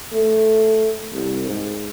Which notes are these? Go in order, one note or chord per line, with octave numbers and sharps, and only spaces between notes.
A3
C2
G#2